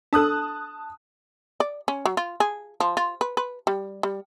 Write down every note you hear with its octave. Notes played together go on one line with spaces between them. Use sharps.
D4 A4 A5 D#6 F#6
D5
C#4
F#3
F4
G#4
F3
F4
B4
B4
G3
G3